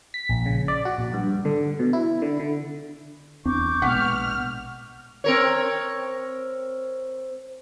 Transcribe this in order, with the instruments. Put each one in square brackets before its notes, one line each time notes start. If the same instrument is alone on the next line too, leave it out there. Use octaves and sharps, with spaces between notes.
[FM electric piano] B6
A#1
C#3
D5
F#4
A#1
G2
D3
B2
E4
D3
D3
[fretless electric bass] E2 C4 D4 [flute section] C#6 D6 G6
[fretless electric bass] A#1 B2 G#3 [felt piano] F#5 B6 [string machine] F6
[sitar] C4 A#4 C#5